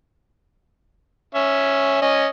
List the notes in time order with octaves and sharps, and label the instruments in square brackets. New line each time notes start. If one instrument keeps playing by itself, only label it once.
[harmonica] C#4 E5
C#4 D#5